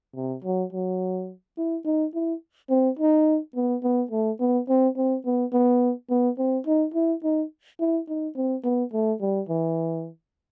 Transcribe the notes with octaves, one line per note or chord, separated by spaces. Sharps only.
C3
F#3
F#3
E4
D#4
E4
C4
D#4
B3
B3
A3
B3
C4
C4
B3
B3
B3
C4
D#4
E4
D#4
E4
D#4
C4
B3
A3
G3
E3